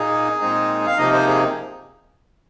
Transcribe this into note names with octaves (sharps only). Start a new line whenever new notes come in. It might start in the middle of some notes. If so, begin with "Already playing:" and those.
Already playing: A#2 A#3 D#4 G#4
A#2 G#3 C4 D#4
F5
C3 F3 A#3 D#4 D#5
C5
G#4